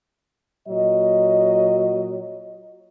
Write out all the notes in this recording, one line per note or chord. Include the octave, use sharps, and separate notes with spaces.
A#2 F#3 D#5